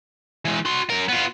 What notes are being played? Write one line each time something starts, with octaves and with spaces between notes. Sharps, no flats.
E3 G#3
F#4 C6
F#2 A#4
B3 F4